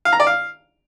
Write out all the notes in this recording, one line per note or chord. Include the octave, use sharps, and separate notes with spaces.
F5
A#5
D5
F5